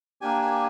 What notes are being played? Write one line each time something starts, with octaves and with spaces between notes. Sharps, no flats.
A#3 D4 G4 G#5
G#5